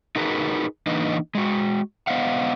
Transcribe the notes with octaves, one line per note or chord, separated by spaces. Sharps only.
D#4 F#4 G#4 A#4 B4
E3 A#3 D4 D#4 B4 D#5
G#3 F#4
B3 C5 D#5 F5 F#5